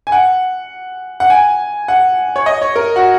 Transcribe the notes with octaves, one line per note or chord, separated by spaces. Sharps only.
G#5
F#5
F#5
G#5
F#5
C#5
D#5
C#5
A#4
F#4